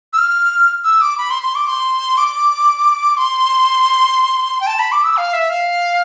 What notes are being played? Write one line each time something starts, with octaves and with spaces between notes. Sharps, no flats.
E6
F6
E6
D6
B5
C6
C6
D6
C6
D6
C6
G5
A5
B5
D6
E6
F5
E5
F5